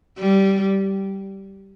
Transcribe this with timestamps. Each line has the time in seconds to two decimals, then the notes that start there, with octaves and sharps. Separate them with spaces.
0.18 G3